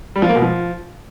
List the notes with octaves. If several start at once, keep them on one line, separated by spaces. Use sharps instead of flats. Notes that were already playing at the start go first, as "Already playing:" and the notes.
G3
F3
A#3
B2
F3